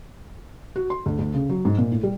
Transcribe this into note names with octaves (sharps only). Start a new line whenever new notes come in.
F#4
C6
D2
D2
C#3
F#3
G#2
A#2
A2
G3